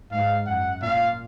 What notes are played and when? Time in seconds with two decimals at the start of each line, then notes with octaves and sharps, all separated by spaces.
0.11 G#2 F5
0.46 F#2 F#5
0.82 A#2 F5